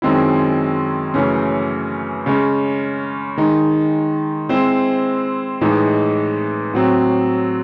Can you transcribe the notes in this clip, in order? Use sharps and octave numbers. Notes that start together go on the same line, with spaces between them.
F#2 D#3 G#3 C4 E4
F#2 C#3 E3 A3 C#4
C#3 G#3 C#4
D#3 G#3 D#4
G#3 C4 E4 C5
A2 E3 G#3 D#4 G#4
A2 F#3 C4